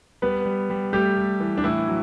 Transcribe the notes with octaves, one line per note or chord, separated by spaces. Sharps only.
G3 B3 B4
G3
G3
G3 A3 G4
A3
E3
D4
A2 E3 E4
F#3